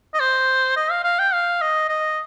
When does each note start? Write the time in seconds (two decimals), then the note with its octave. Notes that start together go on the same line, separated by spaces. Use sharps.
0.14 D#5
0.20 C5
0.76 D#5
0.91 F5
1.04 F5
1.19 G5
1.33 F5
1.61 D#5
1.89 D#5